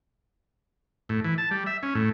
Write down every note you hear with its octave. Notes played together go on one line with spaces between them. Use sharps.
A2
E3
A5
G3
E5
C#4
A2